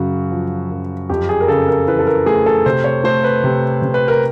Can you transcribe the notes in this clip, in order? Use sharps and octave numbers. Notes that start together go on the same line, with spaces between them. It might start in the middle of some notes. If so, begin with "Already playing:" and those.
Already playing: F#2 C#3 F#4
F3
F#2
F2 G4
G#4
A#4
C#3 A4
A#4
E3 B4
A4
A#4
A3 G#4
A4
C3 C5
C#5
A3 C5
B4
C3
C3
B4
A#4